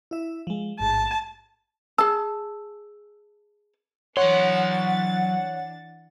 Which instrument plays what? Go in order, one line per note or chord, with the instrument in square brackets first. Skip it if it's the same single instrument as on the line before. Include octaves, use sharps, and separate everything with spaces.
[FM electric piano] E4 E5
F3 G#3
[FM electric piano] A1 G#2 [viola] A5
[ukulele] G#4 A5 [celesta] E6
[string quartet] E3 D4 A6 [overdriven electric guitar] F#3 C6 [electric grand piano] C#5 [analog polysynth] F#5